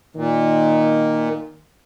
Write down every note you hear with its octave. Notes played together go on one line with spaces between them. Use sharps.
A#2 D#3